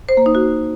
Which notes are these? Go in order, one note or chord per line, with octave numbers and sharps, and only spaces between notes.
C5
A#3
D#4
F#4